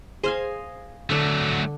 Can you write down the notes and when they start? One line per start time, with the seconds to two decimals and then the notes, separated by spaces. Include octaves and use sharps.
0.23 G#4 C5 D#5 F5 G#5
1.10 D3 F#3 A3 D4 F#5